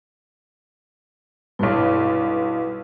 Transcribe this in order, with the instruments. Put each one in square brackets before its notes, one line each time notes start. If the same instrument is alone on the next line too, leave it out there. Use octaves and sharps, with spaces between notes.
[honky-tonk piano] B1 G2 [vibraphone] E4 B4 F5